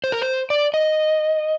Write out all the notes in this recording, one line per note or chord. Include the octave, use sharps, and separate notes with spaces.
C5
A#4
C5
D5
D#5